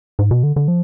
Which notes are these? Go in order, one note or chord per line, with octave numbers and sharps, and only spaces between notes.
G#2
B2
D3
D3
F3